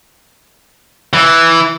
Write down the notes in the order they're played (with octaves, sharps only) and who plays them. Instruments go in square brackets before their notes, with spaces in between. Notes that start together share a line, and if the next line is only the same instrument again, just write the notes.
[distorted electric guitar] E3